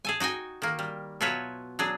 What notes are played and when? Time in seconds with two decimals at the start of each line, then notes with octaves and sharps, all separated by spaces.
0.05 G#4 A4 G#5
0.20 D#4 F#4 G5 G#5
0.62 D#3 A#3
0.79 G3
1.21 B2 F#3 F4 B4 C#5 E5
1.79 F#3 D4 G#4